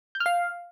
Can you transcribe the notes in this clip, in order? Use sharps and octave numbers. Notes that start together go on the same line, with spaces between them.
G6
F6
F5